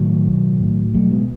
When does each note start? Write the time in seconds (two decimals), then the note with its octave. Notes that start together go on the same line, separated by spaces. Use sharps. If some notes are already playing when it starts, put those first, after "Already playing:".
Already playing: A2 D#3 F#3
0.26 B1
0.60 A2
0.94 B1 F#3 A3
1.11 G#3 B3